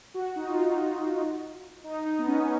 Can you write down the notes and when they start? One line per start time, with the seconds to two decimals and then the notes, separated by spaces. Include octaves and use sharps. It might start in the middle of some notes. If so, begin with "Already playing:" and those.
0.14 F#4
0.36 D#4
0.47 F4
0.57 D#4
1.84 D#4
2.06 D#4
2.19 B3
2.27 C#4